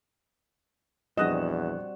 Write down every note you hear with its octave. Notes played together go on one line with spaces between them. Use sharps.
A#1 E2 G3 C4 F#4 D#5 F#6 E7